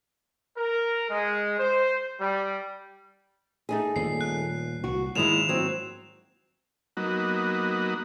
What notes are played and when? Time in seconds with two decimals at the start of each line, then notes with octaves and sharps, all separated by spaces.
0.57 A#4
1.09 G#3
1.59 C5
2.20 G3
3.69 A3 D#4 G#4
3.96 D#1 A#2 C7
4.21 F#6
4.84 C2 F#4
5.15 E2 G#2 D#3 F3 G#3 E4 E7 F7
5.49 F#3 C4
6.97 F#3 A#3 B3 D#4 F#4